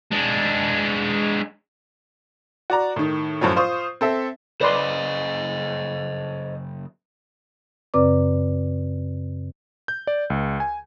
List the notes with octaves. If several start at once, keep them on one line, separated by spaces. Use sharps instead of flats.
G#3 D4
F#4 D5 A#5
A2 D#3
F#2 A2 F3 F#3 C#4
F4 C5 C#6 D#6
C4 A4 E5
F#2 C#3 B4 C5 D5 D#5 C6
F#2 C#3 C4 B4 D5 D6
G6
D5
C#2
G#5